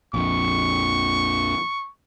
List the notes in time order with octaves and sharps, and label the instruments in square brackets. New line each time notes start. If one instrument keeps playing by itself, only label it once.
[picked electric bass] A#1 F2 [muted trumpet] C#6